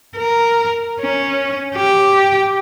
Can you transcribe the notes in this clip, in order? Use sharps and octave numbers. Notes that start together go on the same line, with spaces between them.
A#4
C#4
G4